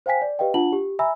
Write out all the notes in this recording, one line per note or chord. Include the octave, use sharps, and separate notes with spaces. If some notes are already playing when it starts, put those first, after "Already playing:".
C5 F5 G5 G#5 B6
D5
G4 B4 D#5 F5 G5
D4 F4 F#5 A5 F#7
G4
E5 G#5 A#5 B5 E6